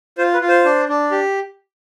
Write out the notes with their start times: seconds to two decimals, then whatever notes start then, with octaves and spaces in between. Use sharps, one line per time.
0.18 F4 C5
0.34 B4
0.41 F4
0.49 C5
0.65 D4
0.89 D4
1.11 G4